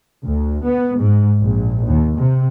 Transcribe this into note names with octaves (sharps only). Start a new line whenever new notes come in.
D2
B3
G#2
A#1
D#2
C3